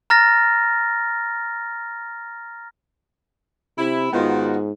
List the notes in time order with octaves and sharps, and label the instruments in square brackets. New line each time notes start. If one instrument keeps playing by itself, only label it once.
[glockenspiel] A#5 F6 A6 A#6
[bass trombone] C3 [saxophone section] E4
[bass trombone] G#2 [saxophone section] D#3 F#4 [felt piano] B3 F4